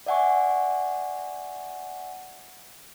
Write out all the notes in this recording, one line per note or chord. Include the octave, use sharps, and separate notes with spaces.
D5 E5 F#5 G#5 C#6